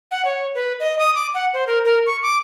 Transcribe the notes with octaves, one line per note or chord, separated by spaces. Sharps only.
F#5
C#5
B4
D#5
D#6
D6
F#5
C5
A#4
A#4
C#6
D6